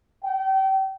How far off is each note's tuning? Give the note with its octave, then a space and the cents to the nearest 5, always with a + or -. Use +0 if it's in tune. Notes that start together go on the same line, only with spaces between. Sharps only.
G5 -30